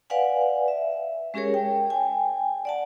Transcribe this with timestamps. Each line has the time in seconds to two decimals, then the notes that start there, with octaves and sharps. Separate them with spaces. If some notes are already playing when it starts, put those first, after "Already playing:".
0.10 B4 D5 F5 F#5 G#5
0.68 E5
1.34 G#3 C#4 G4 G#4 A#4 C#5
1.54 G5
1.90 G5 G#5
2.65 D5 F#5 A5